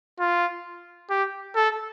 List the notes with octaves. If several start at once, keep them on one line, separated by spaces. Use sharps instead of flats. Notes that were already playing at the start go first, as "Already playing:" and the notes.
F4
G4
A4